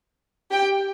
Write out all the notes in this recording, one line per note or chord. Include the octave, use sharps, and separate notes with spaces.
G4 G5